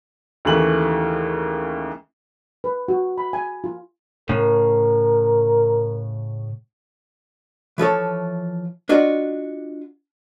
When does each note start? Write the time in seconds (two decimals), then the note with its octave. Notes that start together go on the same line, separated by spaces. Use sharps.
0.45 D#2 C#3 E3 A3 F#7
2.64 B4
2.88 F#4
3.18 B5
3.33 G#5
3.64 F4
4.29 A2 C#3 A#4
7.78 E3 F3 A4 C#5
8.89 D4 F4 F#4 D#5